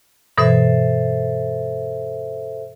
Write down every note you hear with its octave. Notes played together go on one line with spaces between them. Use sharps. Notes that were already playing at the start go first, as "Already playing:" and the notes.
G2 B2 E3 A4 C5 E5